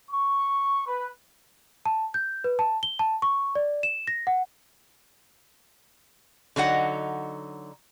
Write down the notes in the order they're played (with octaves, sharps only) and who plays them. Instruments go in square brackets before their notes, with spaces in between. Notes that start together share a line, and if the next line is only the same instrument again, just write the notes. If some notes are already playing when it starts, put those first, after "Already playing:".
[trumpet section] C#6
B4
[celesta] A5
G6
B4
A5
G7
A5
C#6
D5
E7
A#6
F#5
[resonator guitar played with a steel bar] D3 F#3 D#4 F#5